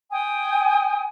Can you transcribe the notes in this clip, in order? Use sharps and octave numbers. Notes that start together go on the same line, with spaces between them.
G5 G#5 D#6